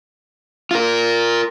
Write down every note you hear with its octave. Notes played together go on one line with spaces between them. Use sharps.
F4 A#4